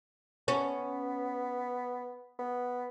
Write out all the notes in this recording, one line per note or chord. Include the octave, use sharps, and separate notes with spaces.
B3 C#4
B3